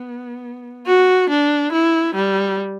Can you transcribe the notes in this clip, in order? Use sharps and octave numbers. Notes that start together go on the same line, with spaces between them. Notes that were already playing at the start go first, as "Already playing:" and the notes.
Already playing: B3
F#4
D4
E4
G3